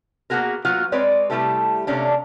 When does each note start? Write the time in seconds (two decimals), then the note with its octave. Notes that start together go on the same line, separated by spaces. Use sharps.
0.30 A#3 B3 C#4 F#4 G#4 A#4
0.65 F#3 A#3 B3 F4 F#4
0.92 G#3 C4 B4 C#5 D5
1.30 C3 G3 A3 E4 G4 A4
1.87 C3 A3 A#3 C#4 D4